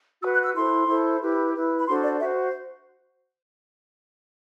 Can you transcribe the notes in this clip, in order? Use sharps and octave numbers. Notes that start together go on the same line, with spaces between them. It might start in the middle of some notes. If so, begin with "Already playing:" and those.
F#4 B4 E6
F#6
E6
E4 A4 C5 C6
E4 A4 C5
E4 G4 B4
E4 B4
B5
D4 F#4 A4 C5 C6
D5
F#4 C5 E5